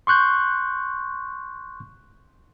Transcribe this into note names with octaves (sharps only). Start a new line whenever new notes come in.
C6 C#6 F#6 G6